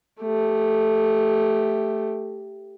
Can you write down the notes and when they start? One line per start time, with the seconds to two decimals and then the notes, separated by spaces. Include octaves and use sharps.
0.21 A3 G4